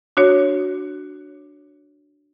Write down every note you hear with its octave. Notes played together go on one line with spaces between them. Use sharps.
D4 F#4 C#5